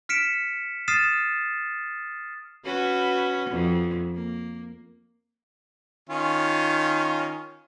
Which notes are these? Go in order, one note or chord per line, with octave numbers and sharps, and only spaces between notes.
F6 B6 C#7 D7 E7
D#6 F6 A6 C7 D#7 E7
C#4 F#4 B4
F2
A#3
D#3 C#4 F4